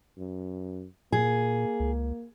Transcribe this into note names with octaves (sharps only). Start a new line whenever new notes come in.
F#2
A#2 A#3 G#4
C#2